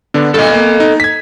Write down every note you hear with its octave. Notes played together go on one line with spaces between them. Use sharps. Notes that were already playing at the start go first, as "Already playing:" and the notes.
D3 B3 D4
G2 A#2 A4 D#5
A#3
D#4
G#6 B6